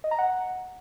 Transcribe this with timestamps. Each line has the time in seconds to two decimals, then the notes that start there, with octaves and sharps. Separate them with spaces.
0.04 D#5
0.11 A#5
0.19 F#5